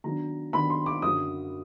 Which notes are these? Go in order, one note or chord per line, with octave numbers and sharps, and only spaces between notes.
D#3 F#3 B3 D4 A#5
D#3 F#3 B3 D4 B5
C6
D6
F#2 D3 F#3 D#6